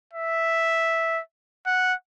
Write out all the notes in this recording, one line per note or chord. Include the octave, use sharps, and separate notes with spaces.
E5
F#5